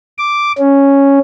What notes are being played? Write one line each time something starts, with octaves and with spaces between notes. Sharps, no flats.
D6
C#4